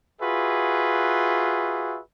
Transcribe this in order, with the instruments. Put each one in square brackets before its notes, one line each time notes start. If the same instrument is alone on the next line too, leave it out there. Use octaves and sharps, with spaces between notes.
[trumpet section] F4 F#4 G#4 B4 E5